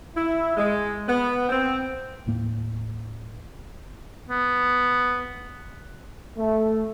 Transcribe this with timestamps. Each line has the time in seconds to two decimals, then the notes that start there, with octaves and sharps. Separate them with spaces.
0.15 E4
0.57 G#3
1.08 B3
1.49 C4
2.27 D#2 A2 A#3
4.29 B3
6.37 A3